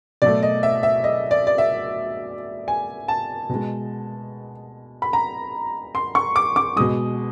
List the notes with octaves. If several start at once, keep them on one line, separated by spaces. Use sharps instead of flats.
B2 F#3 A3 D5
D#5
E5
E5
D#5
D5
D5
E5
G#5
A5
B2 G#3
B5
A#5
C6
C#6
D6
D6
B2 G#3 D#6